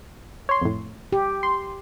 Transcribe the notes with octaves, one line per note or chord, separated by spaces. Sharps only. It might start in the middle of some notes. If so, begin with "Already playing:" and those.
C#5 C6
F2 A2
G4
C6